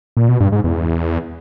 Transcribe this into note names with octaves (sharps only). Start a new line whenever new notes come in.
A#2
B2
G2
G#2
E2